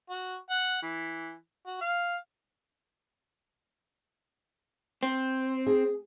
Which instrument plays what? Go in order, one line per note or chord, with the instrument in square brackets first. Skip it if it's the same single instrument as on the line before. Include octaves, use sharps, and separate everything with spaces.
[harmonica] F#4
F#5
E3
F#4
F5
[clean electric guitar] C4
[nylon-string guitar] G#4